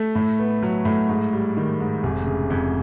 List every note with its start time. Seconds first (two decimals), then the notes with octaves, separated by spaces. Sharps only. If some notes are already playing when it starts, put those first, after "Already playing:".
Already playing: A3
0.15 A2
0.39 B3
0.63 F#3
0.85 A2
1.09 G#2
1.33 G3
1.57 D#3
1.80 G#2
2.03 F1
2.27 C#3
2.50 F2